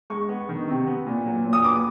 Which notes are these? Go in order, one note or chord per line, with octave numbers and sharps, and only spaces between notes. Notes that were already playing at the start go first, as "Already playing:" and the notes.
G#3 C#6
B3
D#3
C3
B3
A#2
F#3
A#2
D#6
B3 D6